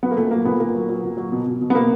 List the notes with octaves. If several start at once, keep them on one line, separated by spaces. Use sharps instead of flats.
F#3 B3
A#3
A#2 A3
F#3 A#3
A#2 B3
A#2 A#3
F#3
F#3
A#2
F#3
B2
B2
B2
B3
B2 A#3